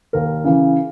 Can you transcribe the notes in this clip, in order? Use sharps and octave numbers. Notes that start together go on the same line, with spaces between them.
D#2 A#4
C#3 E3